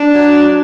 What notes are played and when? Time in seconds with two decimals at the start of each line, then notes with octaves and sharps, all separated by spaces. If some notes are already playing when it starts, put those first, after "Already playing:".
Already playing: D4
0.15 F#3